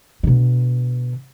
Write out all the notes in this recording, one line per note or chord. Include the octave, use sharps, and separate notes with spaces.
B2 D3